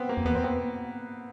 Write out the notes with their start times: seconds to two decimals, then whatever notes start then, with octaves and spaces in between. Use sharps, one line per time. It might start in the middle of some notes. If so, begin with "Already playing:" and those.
Already playing: B3 C4
0.09 A#3
0.17 F2
0.25 E2 B3
0.35 C4
0.44 B3